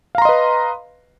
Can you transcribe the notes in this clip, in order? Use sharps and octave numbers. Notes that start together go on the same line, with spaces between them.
B4 D#5 F5 A#5 C6